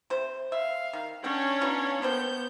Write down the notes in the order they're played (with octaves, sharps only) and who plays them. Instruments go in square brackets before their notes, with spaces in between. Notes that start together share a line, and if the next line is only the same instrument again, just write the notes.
[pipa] C3 C5
[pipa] E5 [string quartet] F5
[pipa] D#3
[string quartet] C#4 D4 C#5 [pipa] A4 F#5 G5
[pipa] B3 D#4 F4
[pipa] A#3 C5 G5 [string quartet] B3 G6